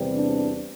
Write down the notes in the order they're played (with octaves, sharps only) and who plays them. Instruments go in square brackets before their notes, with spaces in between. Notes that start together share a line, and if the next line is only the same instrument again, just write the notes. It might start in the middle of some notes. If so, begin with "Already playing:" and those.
Already playing: [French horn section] E2 C3 E3 G3
D4